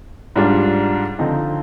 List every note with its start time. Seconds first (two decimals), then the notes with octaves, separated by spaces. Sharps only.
0.36 G#2 G3 D4 F4
1.19 D3 F3 C4 D#4